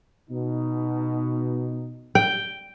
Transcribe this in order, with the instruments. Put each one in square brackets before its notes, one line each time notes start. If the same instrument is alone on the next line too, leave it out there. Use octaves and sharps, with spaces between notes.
[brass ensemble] B2 D#4
[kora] G5